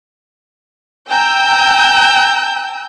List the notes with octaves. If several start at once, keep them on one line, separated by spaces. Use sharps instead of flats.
G5 G#5 A#5 E6 G6